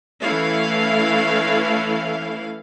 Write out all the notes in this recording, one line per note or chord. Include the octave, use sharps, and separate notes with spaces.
E3 A3 C#4 E4 F5